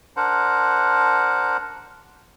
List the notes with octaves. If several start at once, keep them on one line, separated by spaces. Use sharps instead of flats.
D4 A#4 C5 F#5